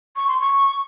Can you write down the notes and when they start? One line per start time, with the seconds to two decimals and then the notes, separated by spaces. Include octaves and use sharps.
0.16 C#6
0.28 C6
0.40 C#6